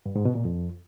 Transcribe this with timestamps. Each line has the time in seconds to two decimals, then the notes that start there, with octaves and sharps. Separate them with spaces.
0.06 G2
0.16 G#2
0.25 B2
0.35 A#2
0.45 F2